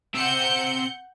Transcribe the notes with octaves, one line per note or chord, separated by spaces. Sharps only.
C4 E5 F#5 G6 C#7